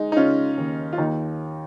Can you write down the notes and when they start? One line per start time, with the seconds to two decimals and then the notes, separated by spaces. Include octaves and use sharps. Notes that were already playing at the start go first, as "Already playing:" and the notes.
Already playing: G#3 D#4
0.12 D#4
0.16 C#3 C#4 F4
0.58 D#2
0.93 F4
0.98 D#2 D#4